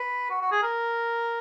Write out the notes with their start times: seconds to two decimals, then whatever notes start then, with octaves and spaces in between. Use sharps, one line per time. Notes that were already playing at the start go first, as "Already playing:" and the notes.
Already playing: B4
0.30 F#4
0.41 F#4
0.52 G#4
0.63 A#4